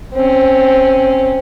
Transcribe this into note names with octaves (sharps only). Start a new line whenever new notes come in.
C4 C#4